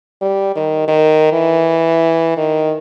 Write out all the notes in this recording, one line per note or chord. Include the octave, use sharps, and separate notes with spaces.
G3
D#3
D#3
E3
D#3